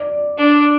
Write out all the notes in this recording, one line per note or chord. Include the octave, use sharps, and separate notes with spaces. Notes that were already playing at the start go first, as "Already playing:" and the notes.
Already playing: D5
D4